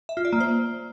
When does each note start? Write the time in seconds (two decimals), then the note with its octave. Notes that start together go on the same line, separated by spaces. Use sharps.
0.09 E5
0.17 F4
0.25 D5
0.33 A#3
0.40 C5